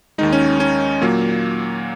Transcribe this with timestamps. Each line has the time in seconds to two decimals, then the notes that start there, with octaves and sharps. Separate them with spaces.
0.18 D#2 D#3 G#3 D#4
0.33 C#4
0.60 C#4
1.01 A#2 F#3 A#3